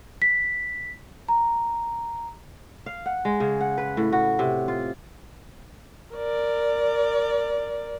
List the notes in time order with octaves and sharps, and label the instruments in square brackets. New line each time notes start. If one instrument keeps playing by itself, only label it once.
[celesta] B6
A#5
[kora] F5
F#5
G#3
C#3
F#5
B4
A2
F#4
C3
F4
[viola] A#4 D5